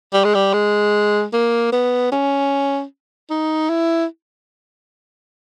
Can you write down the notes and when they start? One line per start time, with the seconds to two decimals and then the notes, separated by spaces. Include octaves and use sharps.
0.13 G3
0.24 G#3
0.35 G3
0.54 G#3
1.33 A#3
1.72 B3
2.12 C#4
3.30 D#4
3.69 E4